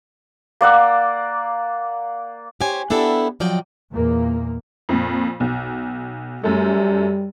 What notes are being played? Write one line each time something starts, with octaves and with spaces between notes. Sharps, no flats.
A#3 D5 F#5 E6
G4 C5 C#5 G#5
B3 D4 E4 G4 A4
F3 F#3 D5 D#5 G5
E2 A#2 A#3
F2 A#2
B1
F#2 G3 A3